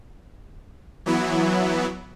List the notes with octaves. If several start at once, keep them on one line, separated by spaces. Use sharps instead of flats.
E3 F#3 B3 E4